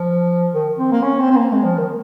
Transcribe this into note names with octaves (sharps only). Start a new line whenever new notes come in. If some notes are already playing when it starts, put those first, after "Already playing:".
Already playing: F3
D#3
C4
A#3
C#4
C4
C4
A#3
G#3
F3
D#3